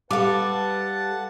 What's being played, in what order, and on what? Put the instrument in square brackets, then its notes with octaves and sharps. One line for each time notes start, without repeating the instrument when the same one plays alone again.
[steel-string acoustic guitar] G3 A4 [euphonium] B4 [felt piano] F5 D6 [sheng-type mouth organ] F#5 A5